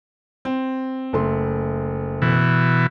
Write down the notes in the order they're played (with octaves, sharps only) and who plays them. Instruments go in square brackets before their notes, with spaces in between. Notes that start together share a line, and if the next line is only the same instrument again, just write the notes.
[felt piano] C4
F#1 A3 C6
[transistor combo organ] B2 E3